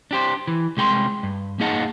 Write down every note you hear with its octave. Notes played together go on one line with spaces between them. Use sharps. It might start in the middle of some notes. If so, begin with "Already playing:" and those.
D4 G4 C5
E3
C2 G#3 G5 B5 C6
G2
A#3 D#4 G#4 D#5 F#5 A5